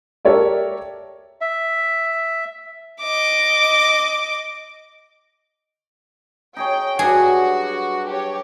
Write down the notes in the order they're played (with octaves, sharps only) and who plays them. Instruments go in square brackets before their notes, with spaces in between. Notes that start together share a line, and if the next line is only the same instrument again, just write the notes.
[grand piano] G4 A4 A#4 C#5 D5 E5
[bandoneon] E5
[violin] D#5 D6
[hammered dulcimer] D#4 G#4 C#5 [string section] G5
[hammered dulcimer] G2 F#3 D4 [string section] F#4 [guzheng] G#4
[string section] G4 C#5